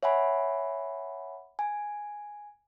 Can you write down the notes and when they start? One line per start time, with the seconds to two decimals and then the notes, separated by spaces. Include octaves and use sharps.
0.03 C#5 E5 F#5 G#5 B5
1.59 G#5